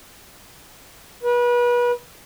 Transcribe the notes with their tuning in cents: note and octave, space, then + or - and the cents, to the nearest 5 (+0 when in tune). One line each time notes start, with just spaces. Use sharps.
B4 -30